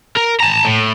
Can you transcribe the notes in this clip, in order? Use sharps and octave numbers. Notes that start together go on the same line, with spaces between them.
A#4
A5 A#5
A2